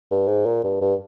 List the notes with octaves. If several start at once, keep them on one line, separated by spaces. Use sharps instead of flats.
G2
G#2
A#2
G2
G2